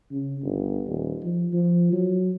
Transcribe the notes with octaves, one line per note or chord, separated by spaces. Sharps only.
C#3
G1
D#1
F3
F3
F#3